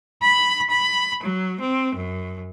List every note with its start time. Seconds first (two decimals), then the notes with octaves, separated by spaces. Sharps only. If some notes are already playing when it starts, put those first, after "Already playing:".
0.21 B5
0.69 B5
1.22 F#3
1.61 C4
1.96 F#2